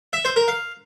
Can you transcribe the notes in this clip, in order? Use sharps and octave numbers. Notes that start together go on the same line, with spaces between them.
E5
C5
A#4
F5